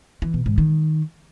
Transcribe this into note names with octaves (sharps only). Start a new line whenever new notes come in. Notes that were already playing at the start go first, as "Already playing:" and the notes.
E3
B2
G#2
D#3